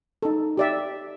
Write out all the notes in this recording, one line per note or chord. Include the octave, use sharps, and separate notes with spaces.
D#4 A4
G4 D5 E5